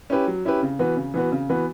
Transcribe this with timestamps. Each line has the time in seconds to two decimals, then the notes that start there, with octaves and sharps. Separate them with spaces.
0.10 C#4 E4 G4 B4
0.28 F#3
0.45 C#4 E4 G4 B4
0.62 C#3
0.79 E3 B3 F#4 B4
0.97 C#3
1.14 E3 B3 F#4 B4
1.32 C#3
1.49 E3 B3 F#4 B4